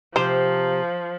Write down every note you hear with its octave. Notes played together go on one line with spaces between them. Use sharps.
C3 F3 G4 C5